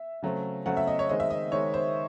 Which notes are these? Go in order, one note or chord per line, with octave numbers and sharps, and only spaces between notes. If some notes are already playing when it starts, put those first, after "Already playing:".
Already playing: E5
C#3 F#3 A3 C4
C#3 F#3 A3 C4 F#5
E5
D#5
C#5
D#3 G#3 C4 D#5
E5
D#5
D#3 G#3 C4 C#5
C5